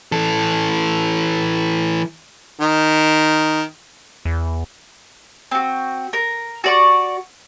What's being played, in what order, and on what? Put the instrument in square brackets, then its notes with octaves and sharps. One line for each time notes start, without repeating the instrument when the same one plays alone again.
[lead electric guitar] E3 A4
[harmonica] D#3
[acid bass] E2
[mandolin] C4 F#4
A#4
F#4 D5 C#6